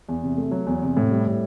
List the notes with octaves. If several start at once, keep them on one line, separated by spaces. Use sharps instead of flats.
E2
C3
A3
F#3
E2
C3
A2
G3
A2